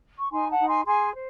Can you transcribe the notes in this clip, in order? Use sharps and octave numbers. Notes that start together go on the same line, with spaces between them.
C#6
D#4 G#5 C6
F#5 A5
D#4
G#5 C6
G#4 G#5 C6
C5